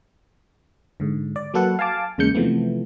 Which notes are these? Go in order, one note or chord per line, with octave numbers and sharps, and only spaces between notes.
G#2 D3
D5
F#3 A#3 F#4 A4 B4 F#5
F5 G#5 A5 D6
E2 C#3 G#3 A#3 G6 C#7
C3 E3 F3 A3 B3